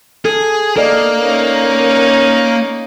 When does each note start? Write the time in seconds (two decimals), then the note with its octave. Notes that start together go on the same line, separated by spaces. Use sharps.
0.25 G#4 A4
0.76 A#3 A4 D5 D#5
1.21 C#4 D#4